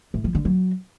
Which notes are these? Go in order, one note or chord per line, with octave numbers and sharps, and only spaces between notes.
A2
F3
D3
F#3